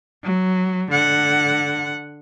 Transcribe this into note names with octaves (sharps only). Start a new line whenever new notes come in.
F#3
D3 F#5